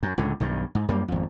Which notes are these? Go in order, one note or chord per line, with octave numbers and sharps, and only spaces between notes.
F#2
C#2 A2 D3
B1 G2 D#3
G#2
F#2 G3 A#3
G#1 F2